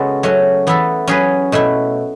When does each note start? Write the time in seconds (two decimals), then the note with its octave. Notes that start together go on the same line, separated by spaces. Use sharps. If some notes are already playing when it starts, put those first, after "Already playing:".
Already playing: C#3 G#3 B3 F#4 A4
0.23 F#3 A3 C#4 F#4
0.67 E3 B3 E4 A4
1.08 F#3 C#4 G#4 B4
1.52 B2 A3 E4